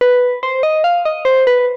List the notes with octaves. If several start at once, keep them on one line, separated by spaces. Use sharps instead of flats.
B4
C5
D#5
F5
D#5
C5
B4